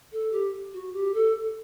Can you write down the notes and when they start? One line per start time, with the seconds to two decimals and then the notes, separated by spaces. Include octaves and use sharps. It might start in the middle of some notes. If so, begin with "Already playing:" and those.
0.11 A4
0.32 G4
0.73 F#4
0.93 G4
1.14 A4